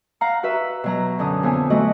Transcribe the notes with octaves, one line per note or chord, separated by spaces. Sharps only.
F5 F#5 A#5
F#4 B4 E5
B2 F#3 A#5
F#2 D3 D#6
F2 B3 G#5
F#3 A3 F#4 D#5